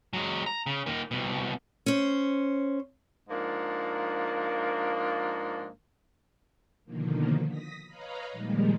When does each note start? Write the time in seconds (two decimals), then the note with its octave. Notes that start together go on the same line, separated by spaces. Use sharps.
0.13 F#3 G#3
0.46 A#5
0.66 C#3
0.86 A#2 D#3
1.11 C2 B2
1.86 C#4 C5
3.30 G#2 F3 A#3 D4
6.85 B2 D3 D#3 F3 A#3
7.47 D#6 A#6 B6
7.86 B4 C#5 D#5 F5 A#5 B5
8.32 A#2 D#3 F3 G3 G#3 A#3